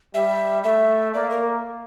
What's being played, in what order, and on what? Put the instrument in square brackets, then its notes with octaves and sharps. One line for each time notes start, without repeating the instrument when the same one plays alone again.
[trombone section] G3 [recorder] E5
[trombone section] A3 [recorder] E5
[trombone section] A#3 [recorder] D5
[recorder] A#4